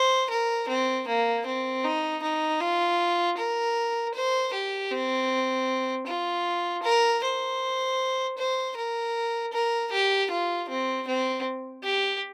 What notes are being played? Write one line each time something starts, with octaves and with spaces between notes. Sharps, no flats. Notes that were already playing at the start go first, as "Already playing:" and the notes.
Already playing: C5
A#4
C4
A#3
C4
D#4
D#4
F4
A#4
C5
G4
C4
F4
A#4
C5
C5
A#4
A#4
G4
F4
C4
C4
G4